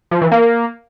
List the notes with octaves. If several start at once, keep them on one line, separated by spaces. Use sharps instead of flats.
F3
E3
A#3